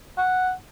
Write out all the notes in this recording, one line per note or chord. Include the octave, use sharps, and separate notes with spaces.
F#5